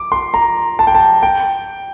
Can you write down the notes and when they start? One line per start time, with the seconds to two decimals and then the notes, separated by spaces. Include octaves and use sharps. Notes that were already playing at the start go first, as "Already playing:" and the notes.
Already playing: D6
0.12 C6
0.34 A#5
0.79 A5
0.87 G5
0.95 A5
1.23 G5